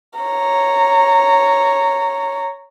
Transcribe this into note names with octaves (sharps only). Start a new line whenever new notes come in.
C#5 A#5